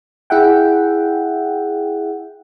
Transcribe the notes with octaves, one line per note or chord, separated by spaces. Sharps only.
E4 G#4 E5 F#5 G5